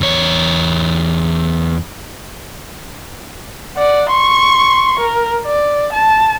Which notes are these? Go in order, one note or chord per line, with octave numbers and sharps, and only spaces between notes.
E2 C#5
D5 F#5
C6 C#6
A#4
D5
A5